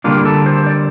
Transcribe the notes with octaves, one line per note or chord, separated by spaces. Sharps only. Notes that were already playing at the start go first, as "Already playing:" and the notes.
D3 G3 A#3 D4 F4
A4
C5
D5